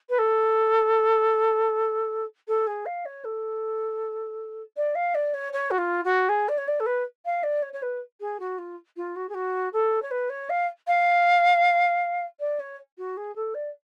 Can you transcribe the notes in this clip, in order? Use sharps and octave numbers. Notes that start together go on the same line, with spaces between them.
B4
A4
A4
G#4
F5
C#5
A4
D5
F5
D5
C#5
C#5
F#4
F4
F#4
G#4
D5
C#5
D5
A4
B4
F5
D5
C#5
C#5
B4
G#4
F#4
F4
F4
F#4
G#4
F#4
A4
C#5
B4
C#5
F5
F5
D5
C#5
F#4
G#4
A4
D5